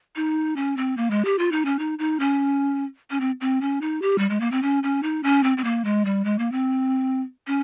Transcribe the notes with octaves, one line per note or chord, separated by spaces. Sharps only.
D#4
C#4
C4
A#3
G#3
G4
F4
D#4
C#4
D#4
D#4
C#4
C#4
C4
C4
C#4
D#4
G4
G3
G#3
A#3
C4
C#4
C#4
D#4
C#4
C4
C4
A#3
G#3
G3
G#3
A#3
C4
C#4